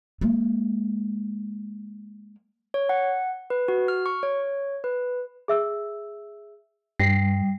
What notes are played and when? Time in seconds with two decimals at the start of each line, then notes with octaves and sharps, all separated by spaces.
0.21 G#3 A#3
2.74 C#5
2.89 F#5
3.50 B4
3.68 F#4
3.88 F6
4.06 C#6
4.23 C#5
4.84 B4
5.48 G#4 E5 E6
7.00 G2 G3 A#6 C7